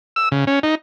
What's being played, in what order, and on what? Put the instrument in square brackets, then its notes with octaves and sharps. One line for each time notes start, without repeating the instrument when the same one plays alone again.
[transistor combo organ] E6
C#3
C#4
D#4